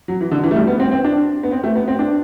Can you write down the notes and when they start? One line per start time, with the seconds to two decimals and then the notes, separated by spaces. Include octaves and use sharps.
0.08 F#3
0.21 E3
0.31 D3
0.44 E3
0.51 A3
0.56 G3
0.67 B3
0.80 C4
0.91 C4
1.04 D4
1.43 B3
1.51 C4
1.64 A3
1.76 B3
1.88 C4
1.99 D4